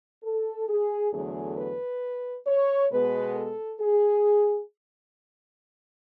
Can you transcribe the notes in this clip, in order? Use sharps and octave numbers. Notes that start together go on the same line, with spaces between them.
A4
G#4
E2 D3 F#3 A3 G#4
B4
C#5
B2 G#3 B3 B4
A4
G#4